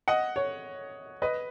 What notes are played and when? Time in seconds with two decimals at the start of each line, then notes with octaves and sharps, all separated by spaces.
0.08 D#5 F#5
0.36 C#5
1.22 B4 D#5